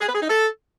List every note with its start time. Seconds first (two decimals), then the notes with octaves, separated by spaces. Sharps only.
0.01 G#4
0.08 B4
0.15 G#4
0.22 D#4
0.29 A4